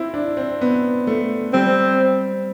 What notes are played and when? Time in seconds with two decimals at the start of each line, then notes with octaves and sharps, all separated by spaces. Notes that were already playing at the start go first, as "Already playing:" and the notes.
Already playing: C4 E4
0.14 D4
0.37 C4
0.61 B3
1.07 A3
1.53 G3 C4